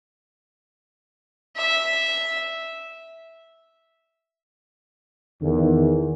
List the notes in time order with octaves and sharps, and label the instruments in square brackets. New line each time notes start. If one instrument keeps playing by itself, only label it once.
[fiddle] E5
[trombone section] E2 [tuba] D#3